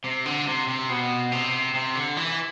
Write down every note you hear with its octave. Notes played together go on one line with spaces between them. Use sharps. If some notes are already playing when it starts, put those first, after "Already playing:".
C3
D3
C3
C3
B2
C3
C3
D3
E3